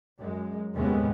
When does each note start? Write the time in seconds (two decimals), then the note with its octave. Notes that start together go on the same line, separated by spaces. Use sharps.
0.19 F#2 G#3
0.74 D#2 A2 C3 G#3 B3 C#4